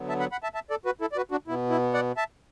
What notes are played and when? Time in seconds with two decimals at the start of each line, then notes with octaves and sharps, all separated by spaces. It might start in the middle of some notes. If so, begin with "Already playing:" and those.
Already playing: D3 F#3 B3
0.09 E5 A5
0.20 F#5 B5
0.32 F#5 B5
0.43 E5 A5
0.54 E5 A5
0.70 A4 D5
0.85 F#4 B4
1.01 E4 A4
1.12 D5
1.17 F#4 B4
1.31 D4 F#4
1.48 B2 B3 E4
1.70 E4
1.94 D5 F#5
2.17 E5 A5